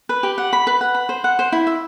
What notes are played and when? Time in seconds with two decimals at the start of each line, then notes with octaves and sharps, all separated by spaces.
0.09 B4
0.23 G4
0.38 F#5
0.53 B5
0.67 B4
0.81 F#5
0.95 B5
1.09 C5
1.24 F#5
1.39 C5
1.52 E4
1.67 E5